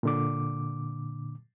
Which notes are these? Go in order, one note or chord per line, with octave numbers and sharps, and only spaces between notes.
A#2 D3 D6